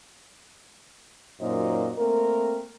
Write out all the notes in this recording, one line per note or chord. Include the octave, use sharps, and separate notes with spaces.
F#2 A#2 F#3 D#4 C5 D#5
A3 A#3 C4 A#4